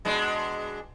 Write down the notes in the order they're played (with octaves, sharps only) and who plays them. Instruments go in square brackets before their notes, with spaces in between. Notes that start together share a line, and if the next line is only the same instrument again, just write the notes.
[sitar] B2 G#3 D4